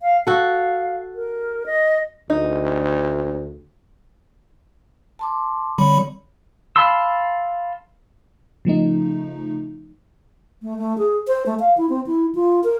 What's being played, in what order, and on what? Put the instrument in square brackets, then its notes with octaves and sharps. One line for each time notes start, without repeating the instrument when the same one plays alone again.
[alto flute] F5
[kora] F#4 A4 [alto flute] F5
[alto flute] A#4
D#5
[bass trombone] D2 [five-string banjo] D#4
[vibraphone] A5 C6 D6
[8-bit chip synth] D3 G3 B5 [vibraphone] C4 C#5 D5
[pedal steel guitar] F5 A5 B5 C6 E6
[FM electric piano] C#3 F3 A3 D#4
[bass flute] A3
A3
G#4
C5
A3
F5
E4
C4
E4
F4
A#4